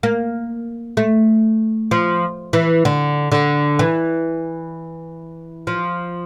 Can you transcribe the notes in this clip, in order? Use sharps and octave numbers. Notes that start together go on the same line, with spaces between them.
A#3
A3
F3
E3
D3
D3
E3
F3